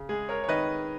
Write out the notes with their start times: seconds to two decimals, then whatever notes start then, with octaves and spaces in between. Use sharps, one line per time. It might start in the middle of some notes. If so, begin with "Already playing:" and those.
Already playing: C#3
0.09 G#3 G#4
0.29 A#4 C#5
0.44 C#5
0.48 D#3 B4 D#5